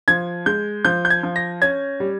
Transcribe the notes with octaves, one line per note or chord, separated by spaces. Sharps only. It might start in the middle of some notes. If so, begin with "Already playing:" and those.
F3 G#6
G#3 G6
F3 G6
G6
G#6
F3
A#6
C#4 G#6
G3